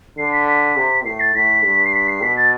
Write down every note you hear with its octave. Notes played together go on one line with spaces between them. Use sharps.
D3 C7
B6
B6
C3
A2 C7
A6
A2 B6
G2
C7
B6
C7
B2 B6
A6